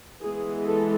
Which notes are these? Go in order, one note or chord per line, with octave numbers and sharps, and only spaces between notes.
E3 G#3 B3 G#4
A4